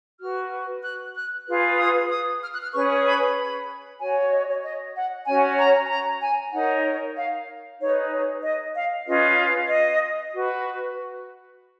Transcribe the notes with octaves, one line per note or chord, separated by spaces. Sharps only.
F#4 B4 F6
F#6
F#6
F4 G#4 B4
D#6
D#6
F6
F#6
F6
C#4 G#4 B4 C#6
B5
B5
F#4 C#5 G#5
D#5
C#5
D#5
F#5
C#4 F#4 C#5 G#5
A#5
G#5
A#5
G#5
D#4 A#4 C#5 F#5
F5
D#4 G#4 B4 C#5
C#5
D#5
F5
C#4 F4 G#4 B4 D#5
D#5
F#4 B4